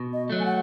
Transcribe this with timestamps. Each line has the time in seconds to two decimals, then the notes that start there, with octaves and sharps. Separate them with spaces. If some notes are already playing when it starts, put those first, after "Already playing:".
Already playing: B2
0.13 D#5
0.30 F#3 A3
0.40 G#5
0.46 F#5